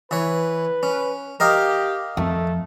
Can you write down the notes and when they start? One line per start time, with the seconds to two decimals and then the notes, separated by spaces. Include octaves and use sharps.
0.11 E3 B4 C#5
0.83 C#4
1.40 G4 A#4 D#5 F5
2.17 F2 A3